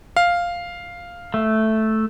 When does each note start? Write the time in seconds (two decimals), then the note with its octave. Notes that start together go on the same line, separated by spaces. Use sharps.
0.16 F5
1.34 A3